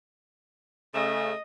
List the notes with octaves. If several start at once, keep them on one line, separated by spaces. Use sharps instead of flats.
C#3 A3 D#5